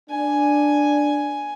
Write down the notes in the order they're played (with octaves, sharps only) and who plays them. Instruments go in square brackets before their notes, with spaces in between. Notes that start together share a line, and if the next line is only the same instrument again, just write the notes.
[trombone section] D4 [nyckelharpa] G#5